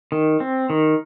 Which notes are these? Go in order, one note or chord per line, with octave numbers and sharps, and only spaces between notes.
D#3
C4
D#3